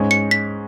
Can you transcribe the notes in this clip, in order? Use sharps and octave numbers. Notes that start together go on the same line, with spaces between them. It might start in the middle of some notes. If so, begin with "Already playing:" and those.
Already playing: G#2 G#3 C#4
C#7
B6